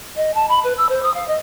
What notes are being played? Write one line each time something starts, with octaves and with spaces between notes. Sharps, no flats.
D#5
A5
B5
B4
E6
C5
D#6
F5
D#5